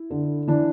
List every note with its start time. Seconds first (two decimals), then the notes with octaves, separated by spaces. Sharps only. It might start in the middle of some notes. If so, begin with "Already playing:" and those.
Already playing: E4
0.10 D3
0.47 E3 D4